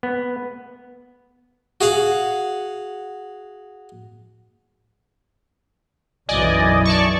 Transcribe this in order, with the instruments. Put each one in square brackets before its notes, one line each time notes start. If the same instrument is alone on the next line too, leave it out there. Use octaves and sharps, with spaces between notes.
[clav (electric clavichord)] B3
[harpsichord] F#4 G#4 F5 F#5
[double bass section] B1 F#2 E3 [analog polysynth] D5 D#5 G#5
[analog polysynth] D5 A5 C#6